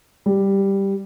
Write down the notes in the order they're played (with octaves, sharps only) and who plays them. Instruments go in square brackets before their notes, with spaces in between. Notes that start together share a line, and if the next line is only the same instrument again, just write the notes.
[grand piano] G3